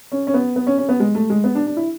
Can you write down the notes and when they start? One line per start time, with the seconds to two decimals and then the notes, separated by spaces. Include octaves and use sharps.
0.12 C#4
0.27 C#4
0.34 B3
0.56 B3
0.67 C#4
0.78 C#4
0.89 B3
1.00 G#3
1.15 A3
1.30 G#3
1.44 B3
1.55 D4
1.67 D4
1.77 E4